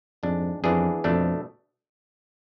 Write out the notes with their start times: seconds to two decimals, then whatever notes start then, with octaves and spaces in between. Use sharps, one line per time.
0.23 F2 G#2 G#3 D4
0.63 F2 E3 B3 D4 G#4
1.04 F2 B2 A3 D4